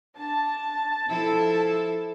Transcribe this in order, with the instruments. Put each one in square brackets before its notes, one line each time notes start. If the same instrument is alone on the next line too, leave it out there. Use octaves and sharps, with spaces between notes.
[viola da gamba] D4 [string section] A5
[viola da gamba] F3 E4 A4